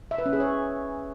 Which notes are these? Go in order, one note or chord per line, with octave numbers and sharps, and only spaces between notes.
E5
B4
C#4
G#4
C#5